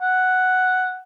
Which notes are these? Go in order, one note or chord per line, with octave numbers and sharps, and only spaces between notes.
F#5